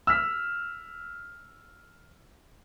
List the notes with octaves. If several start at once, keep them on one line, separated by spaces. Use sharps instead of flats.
E6 F6 B6